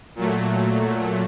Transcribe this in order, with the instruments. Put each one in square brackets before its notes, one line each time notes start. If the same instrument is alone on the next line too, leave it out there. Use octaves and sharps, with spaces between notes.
[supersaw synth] A#2 F#3 A3